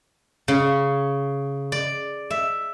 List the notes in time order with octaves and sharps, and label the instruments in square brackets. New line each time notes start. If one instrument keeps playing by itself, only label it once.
[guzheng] C#3
D5
E5